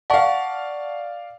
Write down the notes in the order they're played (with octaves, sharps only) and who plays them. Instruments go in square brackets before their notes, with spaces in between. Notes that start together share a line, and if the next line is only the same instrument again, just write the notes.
[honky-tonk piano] D5 F5 [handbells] F#5 A5 C#6